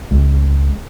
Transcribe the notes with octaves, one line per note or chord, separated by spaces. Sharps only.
C#2